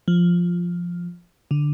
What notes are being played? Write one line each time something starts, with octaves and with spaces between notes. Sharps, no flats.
F3
D3